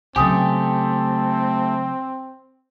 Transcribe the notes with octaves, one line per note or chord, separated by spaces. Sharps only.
C#3 F#3 A3 C4 G4 G#5 D#6